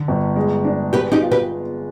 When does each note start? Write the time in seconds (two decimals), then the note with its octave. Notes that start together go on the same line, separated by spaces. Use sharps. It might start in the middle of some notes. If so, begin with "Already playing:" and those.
Already playing: D3 D4
0.08 G1
0.36 G#3
0.65 D4
0.93 B3 G4 B4
1.12 D#4 G4
1.22 F4
1.31 G4 B4